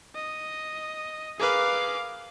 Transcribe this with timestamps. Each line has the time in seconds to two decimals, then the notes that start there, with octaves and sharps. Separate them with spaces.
0.15 D#5
1.40 G#4 A#4 B4 F5 D6